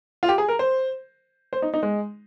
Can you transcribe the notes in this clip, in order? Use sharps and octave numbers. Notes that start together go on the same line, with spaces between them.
F4
G4
G#4
A#4
C5
C5
D#4
D#4
G#3